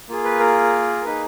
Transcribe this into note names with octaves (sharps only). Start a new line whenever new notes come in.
A#3 F4 G#4
B4
A#4
A#3 D#4 G#4 B4